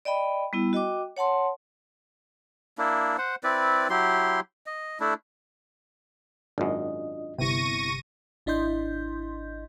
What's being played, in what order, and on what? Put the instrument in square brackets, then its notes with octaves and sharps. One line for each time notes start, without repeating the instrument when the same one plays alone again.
[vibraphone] D5 D#5 G5 B5
G3 B3 E4
F#4 D#5 G5 D6
C#5 F#5 A5 C6
[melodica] A#3 D4 E4
C5 F#5
C4 E4 B4 D5
F#3 E4 G4 C6
D#5
A3 D4 E4
[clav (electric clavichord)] G#1 F#2 [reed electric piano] D4 F4 D#5
[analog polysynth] G1 C3 [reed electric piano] B3 E4 [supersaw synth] C#6 A#6 D#7
[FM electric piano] G#1 D4 E4 D#5 C6 G6